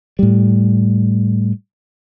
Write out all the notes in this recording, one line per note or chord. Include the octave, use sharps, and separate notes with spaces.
A2 G3